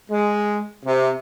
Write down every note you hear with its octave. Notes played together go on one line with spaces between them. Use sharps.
G#3
C3